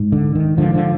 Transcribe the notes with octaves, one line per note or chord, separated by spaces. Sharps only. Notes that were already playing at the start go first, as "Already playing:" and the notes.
Already playing: G#2
D3
D#3
G#2 D3 F3
D3 F3